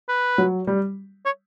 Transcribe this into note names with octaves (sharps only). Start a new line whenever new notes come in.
B4
F#3
G3
C#5